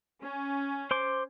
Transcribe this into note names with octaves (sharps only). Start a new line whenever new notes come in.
C#4
C5 C6 D6